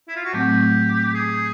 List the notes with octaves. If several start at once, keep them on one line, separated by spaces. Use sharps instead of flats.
E4
F4
F#4
A2 F#3 A3 C4 G4
G#4